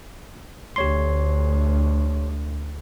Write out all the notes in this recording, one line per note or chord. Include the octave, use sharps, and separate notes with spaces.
D2 G4 C#5 C6